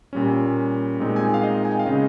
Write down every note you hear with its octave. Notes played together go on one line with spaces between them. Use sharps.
A#2 G3 C#4
A#2 G#3 C4 D#4
G#5
G5
F5
D#5
G#5
G5
F5
C#3 G#3 C#4 D#5